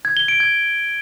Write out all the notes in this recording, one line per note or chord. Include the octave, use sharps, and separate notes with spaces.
G#6
G7
D7
G#6